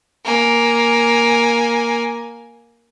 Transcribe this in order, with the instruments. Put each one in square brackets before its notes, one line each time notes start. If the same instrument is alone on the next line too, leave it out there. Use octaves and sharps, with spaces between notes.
[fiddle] A#3 G#5